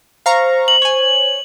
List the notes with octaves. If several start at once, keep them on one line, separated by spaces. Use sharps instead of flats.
C5 F5 A#5 C#6
F#7
C#5 G#5